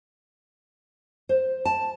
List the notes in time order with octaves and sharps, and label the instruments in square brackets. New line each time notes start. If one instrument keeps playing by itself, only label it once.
[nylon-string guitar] C5
A5